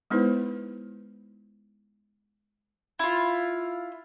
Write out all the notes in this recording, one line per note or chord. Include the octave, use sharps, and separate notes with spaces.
G#3 B3 D#4 E4 B4 C5
E4 F4